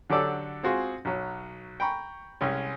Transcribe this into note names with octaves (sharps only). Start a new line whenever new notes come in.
D3 F#3 G4 A4 D5 E6
G#3 C4 F4 F#4 G#4 C6
B1 F#3
G5 A#5 B5 C#6
C2 G#3 C#4